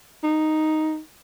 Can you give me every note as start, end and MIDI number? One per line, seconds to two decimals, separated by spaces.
0.23 0.99 63